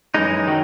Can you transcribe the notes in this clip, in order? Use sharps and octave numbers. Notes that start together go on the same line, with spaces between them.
F#2 E3 G#3 D#4
D#3 F#3